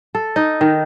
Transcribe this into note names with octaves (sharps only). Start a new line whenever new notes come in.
A4
D#4
D#3